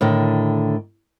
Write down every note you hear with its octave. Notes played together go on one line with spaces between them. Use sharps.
A2 D3 D#3